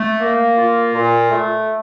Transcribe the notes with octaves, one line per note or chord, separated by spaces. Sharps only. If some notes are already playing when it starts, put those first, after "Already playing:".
Already playing: A3
A#3
F4
A#2
A3